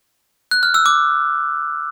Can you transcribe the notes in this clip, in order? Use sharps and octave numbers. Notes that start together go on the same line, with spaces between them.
F#6
F6
E6
D6